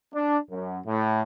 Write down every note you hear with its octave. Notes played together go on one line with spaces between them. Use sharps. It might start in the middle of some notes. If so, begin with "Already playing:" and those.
D4
F#2
A2